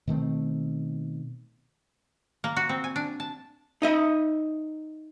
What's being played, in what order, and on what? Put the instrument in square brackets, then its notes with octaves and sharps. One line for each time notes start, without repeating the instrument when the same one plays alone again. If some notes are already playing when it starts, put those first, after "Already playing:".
[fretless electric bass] B2 D#3 A3 C4
[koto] A#3
F#4
C4
G#5
D4
A5
[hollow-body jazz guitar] D#4 D#5 E5